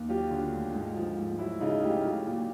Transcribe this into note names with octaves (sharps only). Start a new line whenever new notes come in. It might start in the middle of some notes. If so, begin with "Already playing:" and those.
Already playing: D#2
F#3 F4 G4
D3
D2
G#2
F3
G#2
F#3 E4
C#3 D#4 F4
D2 F4 G4
F#3
A#2